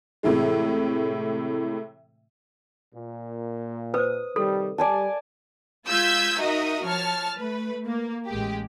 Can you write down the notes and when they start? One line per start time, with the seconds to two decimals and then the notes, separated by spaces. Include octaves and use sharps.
0.23 A2 C3 E3 G#3
2.94 A#2
3.94 B4 C5 D#6
4.36 C3 D#3 G3 A4
4.78 G3 D5 G#5 A5
5.87 G#3 F4 E6 G6 G#6 B6
6.40 D#4 F#4 A#4 D#5 E5 D#6
6.85 F3 C#5 A5 F6
7.37 A3 B4
7.85 A#3
8.28 A1 G#3 G4